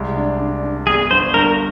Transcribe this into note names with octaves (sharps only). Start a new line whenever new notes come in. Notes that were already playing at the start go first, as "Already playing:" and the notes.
Already playing: C2 G#3
D4
D4
D4
G1 G#4
G1 C5
G2 A#4